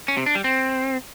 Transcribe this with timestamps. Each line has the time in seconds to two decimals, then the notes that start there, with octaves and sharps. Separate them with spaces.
0.08 C#4
0.17 C3
0.26 D4
0.35 G3
0.44 C4